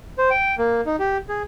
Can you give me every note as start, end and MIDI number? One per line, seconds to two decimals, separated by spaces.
0.18 0.30 72
0.30 0.55 79
0.58 0.81 58
0.86 0.96 63
0.99 1.17 67
1.29 1.43 68